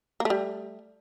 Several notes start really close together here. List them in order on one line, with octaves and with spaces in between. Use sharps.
A#3 A3 G3